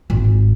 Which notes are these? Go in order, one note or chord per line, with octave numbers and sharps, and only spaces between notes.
G#1